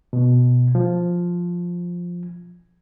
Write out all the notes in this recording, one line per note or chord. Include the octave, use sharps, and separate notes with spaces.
B2
F3